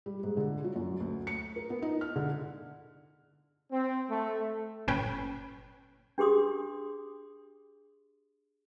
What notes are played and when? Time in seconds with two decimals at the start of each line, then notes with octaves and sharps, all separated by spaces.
0.06 G3
0.23 G#2
0.37 D3
0.64 F#3
0.76 F#2
1.00 D2
1.27 C#7
1.56 A#4
1.70 B3
1.82 D#4
2.01 F6
2.16 D3
3.72 C4
4.10 A3
4.87 G1 A#2 C#4 B4 G5
6.18 D4 G4 G#4 C6 D#6